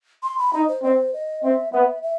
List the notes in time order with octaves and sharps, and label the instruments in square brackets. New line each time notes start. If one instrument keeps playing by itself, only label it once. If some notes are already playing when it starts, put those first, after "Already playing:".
[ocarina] C6
B5
[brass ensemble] D#4 [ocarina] D#5
[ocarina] C5
[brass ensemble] C4 [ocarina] C5 D#5
[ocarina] D#5
[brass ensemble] C4 [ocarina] E5
[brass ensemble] B3 [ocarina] E5
[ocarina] E5